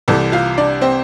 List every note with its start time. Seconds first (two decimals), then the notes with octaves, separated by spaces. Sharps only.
0.08 C2 C3 E3 A4 A5
0.32 F4 F5
0.57 D4 D5
0.81 C4 C5